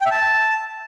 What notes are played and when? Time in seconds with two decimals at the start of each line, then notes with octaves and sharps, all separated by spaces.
0.01 G5
0.06 E5
0.11 A5